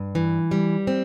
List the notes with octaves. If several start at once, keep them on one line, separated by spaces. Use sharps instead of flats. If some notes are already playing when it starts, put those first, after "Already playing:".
Already playing: G2
E3
G3
C4